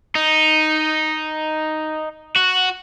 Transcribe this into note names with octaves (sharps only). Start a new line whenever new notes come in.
D#4
F#4